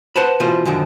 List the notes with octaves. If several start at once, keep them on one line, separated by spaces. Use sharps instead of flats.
B4 C5 F#5 A5 B5
B2 E3 F4 C5
F#2 D3 D#3 F3